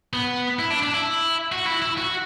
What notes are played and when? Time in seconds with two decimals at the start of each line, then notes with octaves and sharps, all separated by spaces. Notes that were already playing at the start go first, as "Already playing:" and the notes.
0.13 B3
0.59 E4
0.71 D4
0.82 D4
0.94 E4
1.52 F#4
1.66 E4
1.82 E4
1.98 F#4